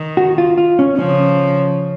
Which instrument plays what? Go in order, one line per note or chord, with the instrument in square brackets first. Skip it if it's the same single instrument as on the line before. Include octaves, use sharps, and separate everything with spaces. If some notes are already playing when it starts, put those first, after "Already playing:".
Already playing: [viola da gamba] D#3
[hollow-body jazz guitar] F#4
F4
F4
C#4
[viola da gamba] C#3 F3 [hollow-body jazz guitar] C#4